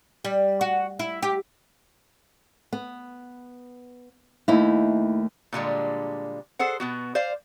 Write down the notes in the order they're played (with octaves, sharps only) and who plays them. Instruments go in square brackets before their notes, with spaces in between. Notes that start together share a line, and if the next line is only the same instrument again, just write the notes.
[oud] G3
F#4
E4
G4
[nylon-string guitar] B3
[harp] D#2 A3 [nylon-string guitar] D#4 E4
[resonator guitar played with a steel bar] A#2 D3 G3 G#3
G#4 A4 C5 F#5
B2 B3 F#4
C5 D5 F5